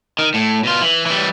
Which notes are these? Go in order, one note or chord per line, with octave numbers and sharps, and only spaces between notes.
D#3
A2
B2 F4
E3
E3 G3